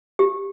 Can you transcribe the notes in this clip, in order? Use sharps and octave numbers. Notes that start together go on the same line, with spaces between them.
G4